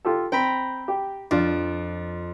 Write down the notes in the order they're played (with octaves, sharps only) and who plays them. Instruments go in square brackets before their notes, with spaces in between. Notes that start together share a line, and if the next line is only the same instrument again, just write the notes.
[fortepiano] F4 G4 A4
[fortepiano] C4 [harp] G5 A#5 B5
[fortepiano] G4
[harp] F2 [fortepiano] D4 F4